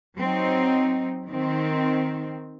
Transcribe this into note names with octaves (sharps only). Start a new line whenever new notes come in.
F#3 C4 D#4
D#3 C4